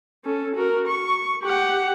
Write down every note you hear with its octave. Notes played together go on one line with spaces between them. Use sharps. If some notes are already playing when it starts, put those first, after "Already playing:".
C#4 A4
F#4 A#4
C#6
G4 F#5